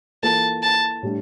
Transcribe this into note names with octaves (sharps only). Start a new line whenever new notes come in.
E3 A#3 F4 A4 A5
A5
A2 G3 D4